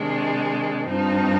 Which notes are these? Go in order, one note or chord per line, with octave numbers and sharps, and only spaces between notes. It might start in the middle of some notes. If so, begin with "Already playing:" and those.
Already playing: C3 D#3 G#3 D4
G2 F3 C4 D#4